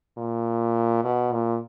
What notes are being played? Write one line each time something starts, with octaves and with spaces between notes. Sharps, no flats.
A#2
B2
A#2